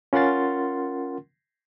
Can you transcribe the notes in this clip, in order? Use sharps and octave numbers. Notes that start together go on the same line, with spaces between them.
C#4 F4 A#4 F#5 C6 A6